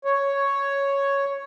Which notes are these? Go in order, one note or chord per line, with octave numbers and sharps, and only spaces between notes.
C#5